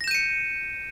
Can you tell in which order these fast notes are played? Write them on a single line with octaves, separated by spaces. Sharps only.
A#6 E7 G6 D#7 C#7